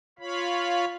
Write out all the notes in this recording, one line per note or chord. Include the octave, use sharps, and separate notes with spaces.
F4 C#5 F5 B5